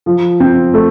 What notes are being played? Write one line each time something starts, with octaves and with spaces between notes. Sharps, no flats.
F3
C4
A3